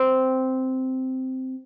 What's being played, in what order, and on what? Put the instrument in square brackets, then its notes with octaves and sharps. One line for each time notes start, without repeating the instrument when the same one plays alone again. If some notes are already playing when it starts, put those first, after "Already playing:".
Already playing: [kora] C4